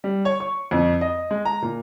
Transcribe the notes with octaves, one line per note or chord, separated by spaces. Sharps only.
G3
C#5
C#6
F2
D#5
G#3
A#5
A#2